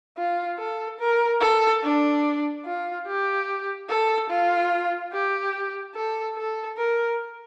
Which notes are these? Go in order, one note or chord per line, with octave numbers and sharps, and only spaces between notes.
F4
A4
A#4
A4
D4
F4
G4
A4
F4
G4
A4
A4
A#4